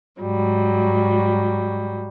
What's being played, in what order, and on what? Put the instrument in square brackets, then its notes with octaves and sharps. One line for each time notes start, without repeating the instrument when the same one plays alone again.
[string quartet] G#2 F#3 G3